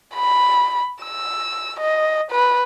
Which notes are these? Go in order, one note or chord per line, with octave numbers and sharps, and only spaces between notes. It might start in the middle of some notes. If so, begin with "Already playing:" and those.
B5
E6
D#5
B4